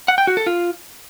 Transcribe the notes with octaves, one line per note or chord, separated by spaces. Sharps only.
F#5
G5
F#4
A4
F4